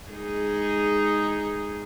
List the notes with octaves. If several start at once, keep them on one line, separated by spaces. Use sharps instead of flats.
G#3 D#4 G#4